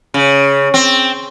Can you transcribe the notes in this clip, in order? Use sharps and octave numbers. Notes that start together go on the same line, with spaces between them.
C#3
C4